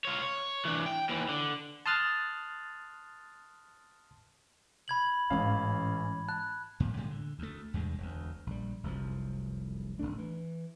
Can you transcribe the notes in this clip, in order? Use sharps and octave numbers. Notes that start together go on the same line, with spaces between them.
F4 C#5
C#5
E3 D4
G5
D#2 E3
D3
A5 C6 D#6 F6 F#6 A6
B5 G#6 F#7
A1 G#2 E3 C#4 F5
A5 F#6
F2 A#2 F3
A2 D3 G3 G#3
D3
D2 A3
E2 G2 C3 G#3
E1 D2
A#1 G3
F1 C2 F#2 F3
G1 G2 A3 D4
E3